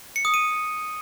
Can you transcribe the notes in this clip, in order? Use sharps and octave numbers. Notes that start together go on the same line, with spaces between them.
C#7
D#6
D#7